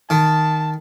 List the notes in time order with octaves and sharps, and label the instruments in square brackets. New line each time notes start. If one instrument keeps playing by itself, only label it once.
[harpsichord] D#3 [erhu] A5